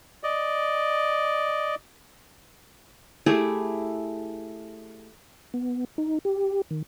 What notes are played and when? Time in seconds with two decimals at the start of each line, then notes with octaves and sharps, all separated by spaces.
0.23 D5 D#5
3.26 A3 E4 G4 G#4
5.54 B3
5.98 D#4
6.25 G4
6.71 D#3